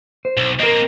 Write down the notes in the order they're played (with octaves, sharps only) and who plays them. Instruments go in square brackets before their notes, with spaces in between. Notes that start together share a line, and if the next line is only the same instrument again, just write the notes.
[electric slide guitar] C5
[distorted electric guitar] B1
[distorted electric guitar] A#3 C4 [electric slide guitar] A#4 D#5